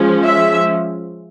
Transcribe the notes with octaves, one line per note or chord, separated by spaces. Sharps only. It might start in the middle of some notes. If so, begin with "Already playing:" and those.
Already playing: F3 G#3 C#4
E5